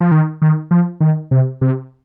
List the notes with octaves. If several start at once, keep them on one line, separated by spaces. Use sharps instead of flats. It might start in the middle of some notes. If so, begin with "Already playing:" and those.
F3
D#3
D#3
F3
D#3
C3
C3